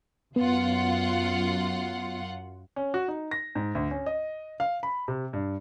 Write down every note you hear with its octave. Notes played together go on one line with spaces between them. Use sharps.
F#2 B3 F4 F#5
C#4
F#4
D#4
A#6
G#2
D2
C#4
D#5
F5
B5
C3
G2